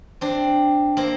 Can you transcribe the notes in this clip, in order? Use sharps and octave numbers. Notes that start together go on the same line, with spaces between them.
C4 D4
A#3 C4